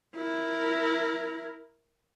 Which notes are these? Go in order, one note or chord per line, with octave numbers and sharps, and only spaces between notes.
E4 A#4